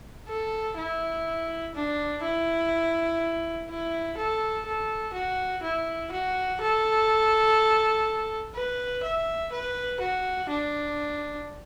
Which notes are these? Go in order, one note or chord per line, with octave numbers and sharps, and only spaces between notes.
A4
E4
D4
E4
E4
A4
A4
F#4
E4
F#4
A4
B4
E5
B4
F#4
D4